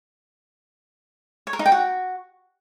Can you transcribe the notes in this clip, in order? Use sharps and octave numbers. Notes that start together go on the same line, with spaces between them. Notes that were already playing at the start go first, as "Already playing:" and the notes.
C#5
A#4
D#4
G5
F#4